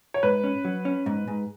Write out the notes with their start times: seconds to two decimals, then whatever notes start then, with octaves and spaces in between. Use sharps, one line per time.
0.14 C#5
0.23 G#2 B4
0.44 C#4
0.65 F#3
0.85 C#4
1.06 G#2
1.28 G#2